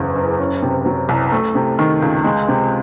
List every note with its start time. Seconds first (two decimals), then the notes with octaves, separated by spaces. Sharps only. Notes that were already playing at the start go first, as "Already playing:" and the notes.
Already playing: F#1 E2 C#3
0.16 F#1
0.39 C#4
0.62 C3
0.86 F#3
1.09 C2
1.32 A3
1.55 C3
1.79 D#3
2.02 C#2
2.24 G#3
2.48 C3